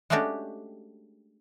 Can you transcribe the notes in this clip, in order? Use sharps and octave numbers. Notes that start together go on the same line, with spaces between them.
G#3 A3 C#4 D4 F#4 G4